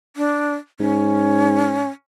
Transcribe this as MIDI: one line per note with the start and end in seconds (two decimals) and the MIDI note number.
0.16 0.55 62
0.80 1.86 44
0.80 1.89 61